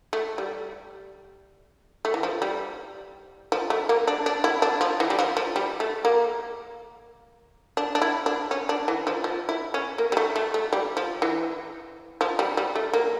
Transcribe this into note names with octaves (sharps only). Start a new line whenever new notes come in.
A3
G3
A3
E3
F3
G3
F3
A3
A#3
D4
D4
E4
D4
F3
E3
G3
F3
F3
G3
A3
A#3
D4
D4
E4
D4
C#4
D4
E3
F3
F3
E4
C#4
A#3
G3
A3
A3
A3
G3
F3
E3
F3
G3
G3
A3
A#3